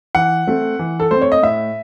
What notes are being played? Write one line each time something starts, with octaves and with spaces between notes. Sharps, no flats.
E3 F#5
A3 C4
E3
A4
A3 C4 C5
C#5
D#5
A2 E5